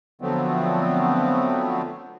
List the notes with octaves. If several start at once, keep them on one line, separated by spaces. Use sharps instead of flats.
D3 F3 F#3 A3 B3 C4